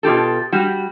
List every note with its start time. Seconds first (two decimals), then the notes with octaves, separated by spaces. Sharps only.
0.03 B2 F4 G4 A4
0.52 G3 F#4